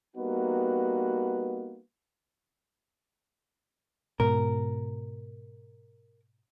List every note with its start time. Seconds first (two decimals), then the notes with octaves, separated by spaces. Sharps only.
0.16 G3 A#3 B3 D#4 F#4 B4
4.20 G#2 B2 A#4